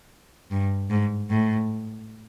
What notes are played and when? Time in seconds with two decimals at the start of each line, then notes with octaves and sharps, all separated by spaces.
0.51 G2
0.90 G#2
1.30 A2